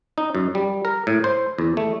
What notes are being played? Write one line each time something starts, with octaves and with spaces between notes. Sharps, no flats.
D#4
F#2
G3
A#4
A2
C5
E2
A3